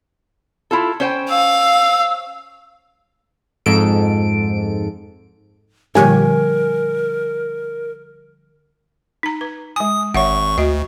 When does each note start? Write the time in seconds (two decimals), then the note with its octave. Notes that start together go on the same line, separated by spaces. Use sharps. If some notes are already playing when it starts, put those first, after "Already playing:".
0.71 E4 F4 A4
1.00 C#4 C5 G5
1.29 F5 E6
3.66 F2 G#2 A4 D7
5.95 A#2 D3 F3 G3 G4 A#4 C#5 G#5
9.23 D#4 A#5
9.41 B4
9.76 G#3 G#5 D#6
10.14 G#1 C#5 E5 F#5 C#6
10.58 D2 F#4 D#5